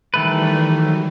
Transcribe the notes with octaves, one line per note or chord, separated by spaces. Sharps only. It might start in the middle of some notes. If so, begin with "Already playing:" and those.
D#3 E3 G3 A3 B4
F#3